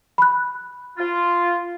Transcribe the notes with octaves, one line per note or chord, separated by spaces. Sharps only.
B5 F#6
F4